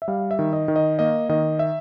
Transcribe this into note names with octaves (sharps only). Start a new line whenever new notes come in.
E5
G3 F5
E5
D#3
D#5
D#3
D#5
A#3 D#5
D#3 D#5
E5